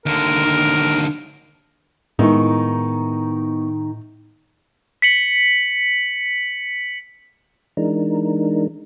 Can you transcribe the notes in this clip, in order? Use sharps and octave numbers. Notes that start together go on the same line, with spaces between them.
D#2 D3 A#4
A2 D#3 G#3 B3 D#4 E4 C#6
B6 C#7 F#7
E3 G#3 D4 D#4 A#4